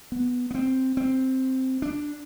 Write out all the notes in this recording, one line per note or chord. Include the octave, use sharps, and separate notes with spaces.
B3
B3
C4
C4
D4